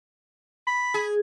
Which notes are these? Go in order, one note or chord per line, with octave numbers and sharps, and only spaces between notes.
B5
G#4